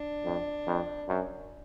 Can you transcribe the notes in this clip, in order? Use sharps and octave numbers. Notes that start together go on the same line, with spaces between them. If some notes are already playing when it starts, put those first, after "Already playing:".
Already playing: D4
F2
F2
F#2